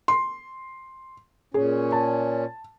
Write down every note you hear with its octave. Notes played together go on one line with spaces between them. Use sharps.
C6
A#2 C#4 G#4
A5